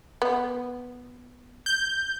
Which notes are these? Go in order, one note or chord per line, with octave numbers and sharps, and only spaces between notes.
B3
G6